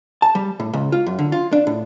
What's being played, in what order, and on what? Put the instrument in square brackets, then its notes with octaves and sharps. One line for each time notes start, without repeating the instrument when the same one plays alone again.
[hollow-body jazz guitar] A5
G3
A2
C#2
F4
F#2
D3
F4
D4
A2